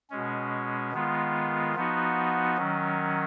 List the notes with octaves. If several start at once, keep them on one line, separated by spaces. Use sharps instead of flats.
B2 G#3 C#4
D#3 G#3 B3 F4
F3 B3 D#4 F#4
D#3 F#3 C#4